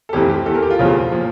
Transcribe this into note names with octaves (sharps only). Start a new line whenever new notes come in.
A4
F1 F2 E3 G4
G4
E2 E3 A4
A#4
G4
F4
F1 E2 C#3 F3
A#2 F3